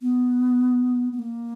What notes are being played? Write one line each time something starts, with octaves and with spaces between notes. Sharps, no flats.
B3
B3
A#3